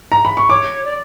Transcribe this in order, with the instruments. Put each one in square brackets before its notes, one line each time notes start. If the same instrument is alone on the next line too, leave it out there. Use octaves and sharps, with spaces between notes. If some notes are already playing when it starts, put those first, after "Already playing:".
[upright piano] A#5
B5
C#6
[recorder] C#5 [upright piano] D6
[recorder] D5